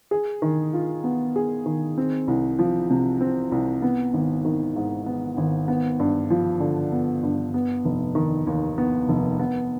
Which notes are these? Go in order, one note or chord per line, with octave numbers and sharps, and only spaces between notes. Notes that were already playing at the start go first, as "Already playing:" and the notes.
G#4
D#3
F4
B3
G#4
D#3
C4
C2
F3
C3
C4
C2
B3
G#1
D#3
G#2
B3
G#1
B3
G2
F3
D3
B3
G2
B3
F1
D#3
D#2
B3
F1
B3